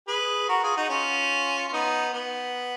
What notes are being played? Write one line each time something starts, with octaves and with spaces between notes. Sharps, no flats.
G#4 B4
F#4 A#4
F4 G#4
D#4 F#4
C#4 F4
F4
B3 D#4
B3